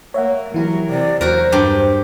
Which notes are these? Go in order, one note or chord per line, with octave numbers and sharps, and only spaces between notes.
A#3 C#5 E5 F#5
E3 F#3 E4 G4 A#4
C3 D5
E2 F#3 F#4 A#4 C5
G2 G4